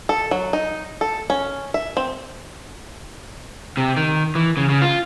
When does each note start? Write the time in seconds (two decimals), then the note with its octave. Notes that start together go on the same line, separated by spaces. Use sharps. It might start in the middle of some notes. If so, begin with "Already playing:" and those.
0.09 A4
0.31 F#3
0.53 D#4
1.01 A4
1.30 C#4
1.74 E5
1.97 C4
3.77 C3
3.96 D#3
4.35 E3
4.57 C#3
4.69 C#3
4.82 F4